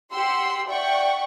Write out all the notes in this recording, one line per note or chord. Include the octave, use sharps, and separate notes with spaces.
G4 F#5 C6 E6
D5 E5 F#5 G5 C#6